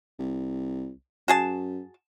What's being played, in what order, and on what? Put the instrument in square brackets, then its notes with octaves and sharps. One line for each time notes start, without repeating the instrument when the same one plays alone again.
[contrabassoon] C2
[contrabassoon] F#2 [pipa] F#4 G#4 A5